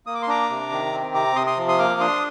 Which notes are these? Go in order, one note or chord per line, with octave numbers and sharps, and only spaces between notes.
A#3 D#6
D6
C6
D4 A#5 D6
C3
D#3
C4
C3 A#5 D6
C3 C6 D#6
C6 D#6
F3
C6 D#6
A#3 D6 F6
D4 C6 D#6